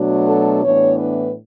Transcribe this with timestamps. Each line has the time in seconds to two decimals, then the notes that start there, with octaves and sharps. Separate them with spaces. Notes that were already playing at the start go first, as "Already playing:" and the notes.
Already playing: B2 F#3 A3 D4
0.29 A4
0.64 A2 E3 B3 D4 C#5
0.99 B4